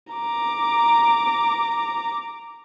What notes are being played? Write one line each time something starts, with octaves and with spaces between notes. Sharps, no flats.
A#5 D6